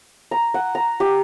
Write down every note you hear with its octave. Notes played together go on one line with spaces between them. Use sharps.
A#5
F#5
A#5
G4